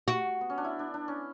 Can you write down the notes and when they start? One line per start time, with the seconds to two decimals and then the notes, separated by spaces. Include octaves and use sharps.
0.08 F#4
0.41 B3
0.50 C#4
0.58 D4
0.64 E4
0.79 D4
0.94 D4
1.08 C#4